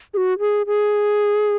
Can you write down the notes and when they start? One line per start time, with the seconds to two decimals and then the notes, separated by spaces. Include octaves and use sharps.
0.14 G#4
0.17 F#4
0.39 G#4
0.67 G#4